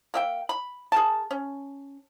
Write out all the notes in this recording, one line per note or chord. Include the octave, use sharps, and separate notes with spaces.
A#3 E5 G5
B5
G#4 A#4 A5
C#4